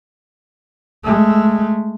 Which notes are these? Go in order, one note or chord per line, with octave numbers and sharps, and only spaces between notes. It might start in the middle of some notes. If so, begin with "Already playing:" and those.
G#3 A3